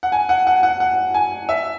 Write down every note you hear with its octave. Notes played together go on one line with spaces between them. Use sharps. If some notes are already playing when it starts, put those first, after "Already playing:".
F#5
G#5
F#5
F#5
F#5
F#5
G#5
E5